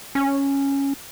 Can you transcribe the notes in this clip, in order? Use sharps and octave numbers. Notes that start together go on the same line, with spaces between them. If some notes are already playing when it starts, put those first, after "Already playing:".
C#4